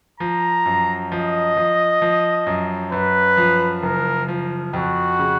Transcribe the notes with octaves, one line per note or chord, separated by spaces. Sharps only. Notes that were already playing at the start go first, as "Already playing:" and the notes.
F3 A#5
F#2
F3 D#5
F3
F3
F#2
F#2 B4
F3
F#1 A#4
F3
F2 F#4
C#3